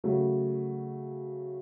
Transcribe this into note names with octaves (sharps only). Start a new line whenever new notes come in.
C#3 F#3 A3